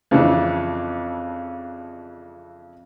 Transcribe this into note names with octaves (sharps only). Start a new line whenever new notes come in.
F2 C#3 E3 D4